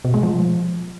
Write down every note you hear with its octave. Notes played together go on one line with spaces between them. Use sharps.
B2
G#3
F3